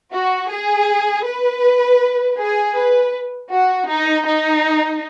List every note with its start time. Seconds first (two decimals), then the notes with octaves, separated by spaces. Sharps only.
0.12 F#4
0.49 G#4
1.25 B4
2.37 G#4
2.75 B4
3.50 F#4
3.88 D#4
4.25 D#4